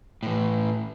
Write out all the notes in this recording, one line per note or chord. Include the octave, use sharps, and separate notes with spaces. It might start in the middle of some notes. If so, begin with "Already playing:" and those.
A2 E3